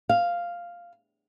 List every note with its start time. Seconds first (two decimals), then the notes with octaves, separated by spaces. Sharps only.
0.09 F5